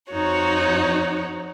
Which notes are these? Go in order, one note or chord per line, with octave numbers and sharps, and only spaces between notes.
F2 D#4 F#4 C#5